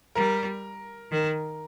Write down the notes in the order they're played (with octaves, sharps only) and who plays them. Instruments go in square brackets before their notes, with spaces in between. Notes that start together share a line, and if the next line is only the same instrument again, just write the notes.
[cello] G3 [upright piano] A#4
[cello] D#3